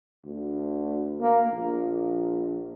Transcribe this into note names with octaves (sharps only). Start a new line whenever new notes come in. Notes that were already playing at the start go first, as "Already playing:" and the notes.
D2
A#3
A#1